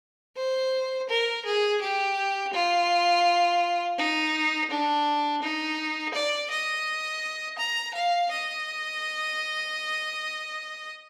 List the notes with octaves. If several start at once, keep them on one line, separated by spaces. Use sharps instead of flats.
C5
A#4
G#4
G4
F4
D#4
D4
D#4
D5
D#5
A#5
F5
D#5